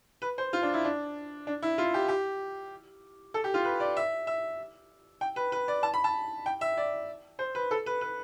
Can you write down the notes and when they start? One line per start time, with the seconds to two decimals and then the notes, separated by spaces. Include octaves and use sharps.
0.22 B4
0.38 C5
0.53 F4
0.63 D4
0.74 E4
0.85 D4
1.47 D4
1.62 E4
1.78 F4
1.94 G4
2.08 G4
3.34 A4
3.44 G4
3.54 F4
3.65 B4
3.80 D5
3.97 E5
4.27 E5
5.21 G5
5.36 B4
5.52 B4
5.68 D5
5.83 A5
5.94 B5
6.04 A5
6.46 G5
6.61 E5
6.77 D5
7.39 C5
7.55 B4
7.71 A4
7.86 B4
8.01 B4